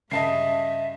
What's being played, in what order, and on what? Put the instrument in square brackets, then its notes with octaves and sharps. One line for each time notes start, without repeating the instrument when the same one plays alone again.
[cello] G2 [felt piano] C#3 [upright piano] D#5 A5 C7 [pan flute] E5